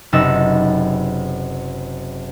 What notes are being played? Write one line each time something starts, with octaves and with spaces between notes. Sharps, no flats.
F#1 C3 D#4 B4 E6 A6